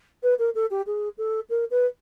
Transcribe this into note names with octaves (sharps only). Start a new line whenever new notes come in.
B4
A#4
A4
G4
G#4
A4
A#4
B4